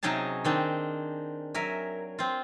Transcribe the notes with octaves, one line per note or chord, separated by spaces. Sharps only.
C3 F#3 C#4 D#4 G#4 A5
D#3 C4 D4
F#3 A#4 E5 G#5
C4 F4